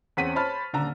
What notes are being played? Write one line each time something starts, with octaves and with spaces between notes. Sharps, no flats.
E2 C4 C#4 F#5 B6 D#7
C5 C#5 A5 B5 F6 A6
D#1 D3 A#5